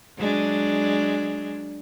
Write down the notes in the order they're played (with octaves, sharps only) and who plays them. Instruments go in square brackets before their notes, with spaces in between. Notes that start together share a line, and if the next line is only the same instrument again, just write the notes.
[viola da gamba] F#3 G#3 D4